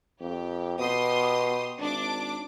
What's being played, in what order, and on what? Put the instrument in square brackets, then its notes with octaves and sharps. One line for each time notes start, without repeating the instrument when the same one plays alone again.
[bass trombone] F2 [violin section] G4
[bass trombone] B2 [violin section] G4 C6 D#6
[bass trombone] G#1 [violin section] D4 D6